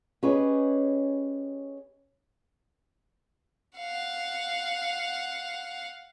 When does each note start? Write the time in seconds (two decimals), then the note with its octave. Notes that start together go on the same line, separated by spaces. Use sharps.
0.23 C#4 G4 G#4 B4 C#5 D#5
3.78 F5 F#5